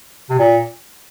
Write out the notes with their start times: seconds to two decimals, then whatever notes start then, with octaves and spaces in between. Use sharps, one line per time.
0.30 C3
0.39 A#2